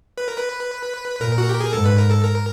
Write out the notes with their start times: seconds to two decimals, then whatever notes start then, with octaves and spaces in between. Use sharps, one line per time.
0.18 B4
0.28 A#4
0.38 B4
1.21 A#2 A#4
1.38 F#4
1.49 G4
1.61 G#4
1.72 G#2 A4
1.85 B4
1.98 A#4
2.11 A4
2.24 A#4